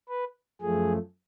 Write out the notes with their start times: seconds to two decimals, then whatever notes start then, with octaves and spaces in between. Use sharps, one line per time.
0.08 B4
0.61 F#2 F3 A3 G#4